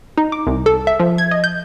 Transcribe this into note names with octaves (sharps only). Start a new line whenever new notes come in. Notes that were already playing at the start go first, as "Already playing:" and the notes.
D#4
D6
C2
A4
E5
F3
G#6
D#5
G6